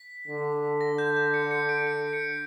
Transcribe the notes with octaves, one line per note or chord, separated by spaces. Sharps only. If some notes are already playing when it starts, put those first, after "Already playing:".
Already playing: B6
D3
A#6
G6
G6
C#7
C#7
D7
C#7
C#7